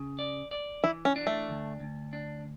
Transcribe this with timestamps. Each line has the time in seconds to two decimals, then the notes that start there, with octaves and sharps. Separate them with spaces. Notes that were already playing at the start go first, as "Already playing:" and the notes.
Already playing: C#3
0.19 D5
0.51 D5
0.84 E3 E4
1.05 C#4
1.16 D4
1.27 A3
1.49 D2
1.80 D2
2.13 D4